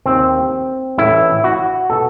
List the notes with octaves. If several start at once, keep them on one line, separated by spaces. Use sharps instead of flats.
D#2 D#3 C4
A1 A2 E3 E4
F#4
B2 A4